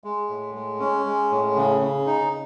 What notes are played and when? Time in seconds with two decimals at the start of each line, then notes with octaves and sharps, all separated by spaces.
0.04 G#3
0.29 A2
0.55 G#3
0.80 C#4
1.06 G#3
1.31 A2
1.56 C#3
1.81 C#3
2.07 D#4